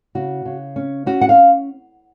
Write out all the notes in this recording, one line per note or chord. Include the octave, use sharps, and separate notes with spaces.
C#3 F#4
C#3
C#4
C#4 F#4
F#5
F5